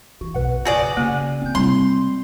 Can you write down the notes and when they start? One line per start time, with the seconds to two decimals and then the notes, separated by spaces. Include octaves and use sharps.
0.21 E3 F#4
0.34 B1 B2 B4 F#5
0.65 F#2 C#3 F#4 G#4 D5
0.97 C#3 A#3 G#5
1.42 E2 C4 F4 G6
1.55 C3 G3 G#3 C4 E4 C6